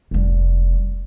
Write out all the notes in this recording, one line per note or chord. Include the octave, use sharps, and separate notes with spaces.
F1 G3